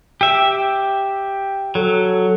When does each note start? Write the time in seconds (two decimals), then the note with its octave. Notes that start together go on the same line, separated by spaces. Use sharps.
0.21 G4 E5
1.75 F#3 A4